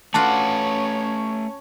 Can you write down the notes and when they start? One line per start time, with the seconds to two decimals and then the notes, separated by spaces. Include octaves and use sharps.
0.14 A3 C#4 F4 F#4 B4 C#5 D5 A5